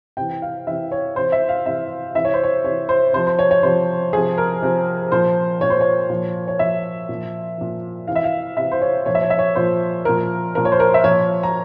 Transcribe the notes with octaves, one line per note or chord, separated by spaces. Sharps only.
C3 E3 G5
F5
C3 E3 E5
C#5
C3 E3 C5
E5
F5
C3 E3 E5
C3 E3 E5
C#5
C5
C#5
C3 E3 C#5
C5
C3 F3 C5
C5
C#5
C#5
C3 F3 C5
C3 F3 G#4
A#4
C3 F3
A#2 F3 C5
A#2 F3 C#5
C5
C#5
A#2 F3
C#5
A#2 F3 E5
A#2 F3
A#2 F3
C3 E3 F5
E5
F5
C3 E3 E5
C5
C#5
A#2 F3 C#5
E5
C#5
E5
C#5
A#2 F3 C5
A#2 F3 A#4
A#2 F3 A#4
C#5
C5
A#4
E5
A#2 F3 C#5
A#5